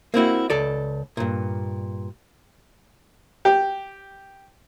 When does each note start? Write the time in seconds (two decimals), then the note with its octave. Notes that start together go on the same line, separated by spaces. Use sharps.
0.14 A#3 C4 E4 F#4
0.50 C#2 A4 D5
1.17 G2 A#2
3.45 G4